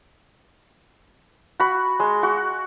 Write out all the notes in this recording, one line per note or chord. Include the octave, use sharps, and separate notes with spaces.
F#4 B5
G#3
F#4